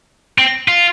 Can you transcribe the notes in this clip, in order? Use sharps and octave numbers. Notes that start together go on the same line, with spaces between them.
C4
F4